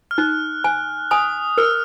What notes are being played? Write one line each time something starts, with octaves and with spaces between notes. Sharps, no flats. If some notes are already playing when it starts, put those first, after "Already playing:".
F6
D#4 F#6
G#5 F#6
G#5 D#6
A#4 F6